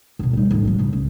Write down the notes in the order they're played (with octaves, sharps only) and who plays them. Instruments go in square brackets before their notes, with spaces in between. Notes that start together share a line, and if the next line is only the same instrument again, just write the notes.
[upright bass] D2 B2
G3 D#4
A1 D3
E3 F#3
D#1 C#3
C#2